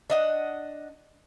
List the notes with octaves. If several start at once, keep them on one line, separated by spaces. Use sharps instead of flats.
D4 D#5 F#5